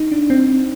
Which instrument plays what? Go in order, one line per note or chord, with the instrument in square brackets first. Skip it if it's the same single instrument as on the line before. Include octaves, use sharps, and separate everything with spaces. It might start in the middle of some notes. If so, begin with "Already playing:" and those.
Already playing: [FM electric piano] D#4
D4
C4